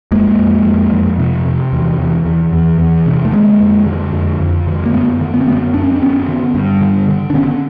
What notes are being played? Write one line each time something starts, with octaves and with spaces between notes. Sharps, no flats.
F2 G#3 A#3
F2
F2
F2
C3
C3
E2
E2
E2
E2
E2
C3
A3
D3 G#3 A#3
F2
D3
F2
F2
D3
A#3
F#2 A3 B3
D3
B3
C4
F#2 A3 B3
F#2 D4
C#4
C4
F#2 B3 C#4
D3
G2
D3
D3
D4
D3 B3 C#4